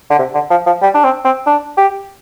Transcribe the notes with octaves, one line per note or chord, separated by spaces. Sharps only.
D3
C3
D3
F3
F3
G3
D4
C4
C4
D4
G4